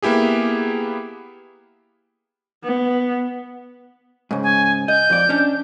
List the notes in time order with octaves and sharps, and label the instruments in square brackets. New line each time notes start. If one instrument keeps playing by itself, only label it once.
[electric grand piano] A#3 B3 E4 G4 G#4
[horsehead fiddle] B3
[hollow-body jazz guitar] G#2 C#3
[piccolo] G#5
[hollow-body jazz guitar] D#5 [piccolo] G6
[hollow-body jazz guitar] F2 D5
C#4 D4